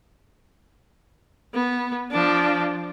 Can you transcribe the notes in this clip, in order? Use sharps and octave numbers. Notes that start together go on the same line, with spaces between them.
B3
F3 D4